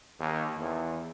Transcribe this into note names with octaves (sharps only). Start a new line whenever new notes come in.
D#2
E2